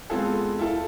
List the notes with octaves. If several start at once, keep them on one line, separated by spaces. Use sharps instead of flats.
G#3 B3 C4 F4 G#4 A4
E4 F4 A4